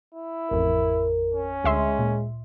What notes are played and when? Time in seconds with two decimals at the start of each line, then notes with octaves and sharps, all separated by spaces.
0.14 E4
0.51 A1 F2 A#4
1.34 C#4
1.64 D2 G#3 E5 C6
1.99 A#2